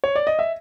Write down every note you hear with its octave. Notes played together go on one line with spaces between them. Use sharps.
C#5
D5
D#5
E5